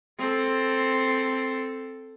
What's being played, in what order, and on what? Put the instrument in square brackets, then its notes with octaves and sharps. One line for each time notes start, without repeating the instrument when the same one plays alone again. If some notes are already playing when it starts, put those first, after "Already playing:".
[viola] C4 A4